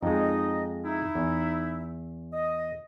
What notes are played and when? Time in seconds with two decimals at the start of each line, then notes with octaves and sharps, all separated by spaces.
0.03 F2 G#3 D#4 D#5
0.85 D#4 E4
1.15 E2
2.33 D#5